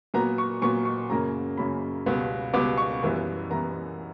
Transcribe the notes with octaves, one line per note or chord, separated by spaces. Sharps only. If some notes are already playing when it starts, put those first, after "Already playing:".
A#2 F#3 B3 A#5
C#6
A#2 F#3 B3 C#6
C#6
F#2 C#3 F#3 A#3 A#5
F#2 C#3 F#3 A#3 B5
C#2 B2 G3 B3
C#2 B2 G3 B3 D6
C#6
F#2 E3 G3 B3
E3 G3 B3 A#5